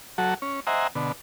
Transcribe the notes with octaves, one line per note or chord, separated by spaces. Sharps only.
F#3 F#4 A4
C#4
C5 D#5 E5 F#5 G#5 A#5
B2 D3